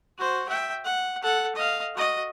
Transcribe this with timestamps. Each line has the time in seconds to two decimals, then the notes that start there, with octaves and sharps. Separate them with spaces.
0.18 F#4 C5
0.49 E5 G5
0.85 F#5
1.23 A4 F#5
1.55 D#5 F5
1.95 F#4 D#5